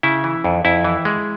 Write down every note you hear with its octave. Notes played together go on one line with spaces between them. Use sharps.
C#3 E4
E3
F2
F2 E4
E3
G#3